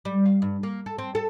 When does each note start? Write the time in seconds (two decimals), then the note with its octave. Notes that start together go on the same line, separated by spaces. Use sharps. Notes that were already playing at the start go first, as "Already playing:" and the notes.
0.05 G3
0.25 F5
0.42 G2
0.63 A#3
0.86 A4
0.98 C4
1.15 A4